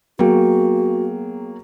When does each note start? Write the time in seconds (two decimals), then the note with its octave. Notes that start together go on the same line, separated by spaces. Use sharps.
0.19 F#3 A#3 B3 F#4 G#4 G5